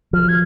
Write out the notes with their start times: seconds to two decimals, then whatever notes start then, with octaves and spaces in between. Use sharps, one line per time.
0.13 F3 F6
0.29 G#6